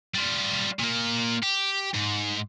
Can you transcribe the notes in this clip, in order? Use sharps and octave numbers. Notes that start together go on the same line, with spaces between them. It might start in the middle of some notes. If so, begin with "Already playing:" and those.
G3 F4
A#2 A#3
G4
G#2